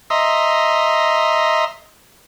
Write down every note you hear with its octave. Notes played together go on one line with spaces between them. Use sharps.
D#5 E5 A#5 C6